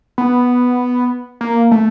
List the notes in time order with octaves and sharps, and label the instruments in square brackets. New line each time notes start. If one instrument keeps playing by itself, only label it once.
[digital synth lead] B3
A#3
A3